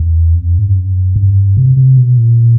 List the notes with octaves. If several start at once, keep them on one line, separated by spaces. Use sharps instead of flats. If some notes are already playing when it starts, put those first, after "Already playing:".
Already playing: E2
F2
G#2
G2
F#2
G2
C3
C3
B2
A#2